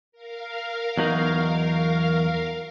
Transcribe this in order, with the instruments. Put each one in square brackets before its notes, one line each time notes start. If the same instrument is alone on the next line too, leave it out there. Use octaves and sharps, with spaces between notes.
[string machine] A#4 F5
[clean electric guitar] E2 F#3 D#4